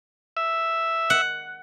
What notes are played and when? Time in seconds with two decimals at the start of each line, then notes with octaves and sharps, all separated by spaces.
0.37 E5
1.10 F#5